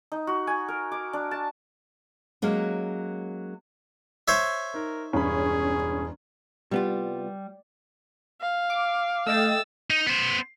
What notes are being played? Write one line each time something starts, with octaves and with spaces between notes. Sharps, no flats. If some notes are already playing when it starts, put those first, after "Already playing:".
D#4
F#4
G#5
A#4
D6
D4
A5
F#3 G#3 A#3 C#4
C5 C#5 E5
D#4 A#4
E1 G2 C#4 G#4 B5
C2 G3 B3 F4
F5
D6
A3 D#5 G5 E6 A6
D#4
B3 C5